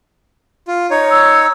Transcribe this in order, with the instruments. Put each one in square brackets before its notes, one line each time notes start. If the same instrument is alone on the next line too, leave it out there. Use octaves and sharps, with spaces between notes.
[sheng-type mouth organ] F4
D#4 C#5
[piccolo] E6